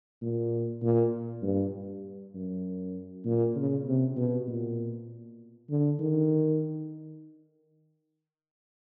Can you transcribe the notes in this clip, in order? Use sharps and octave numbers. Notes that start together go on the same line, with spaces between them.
A#2
A#2
G2
F#2
A#2
C#3
C3
B2
A#2
D3
D#3